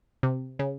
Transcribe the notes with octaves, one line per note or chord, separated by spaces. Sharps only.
C3
C#3